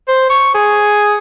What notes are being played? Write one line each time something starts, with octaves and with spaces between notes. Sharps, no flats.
C5
C#6
G#4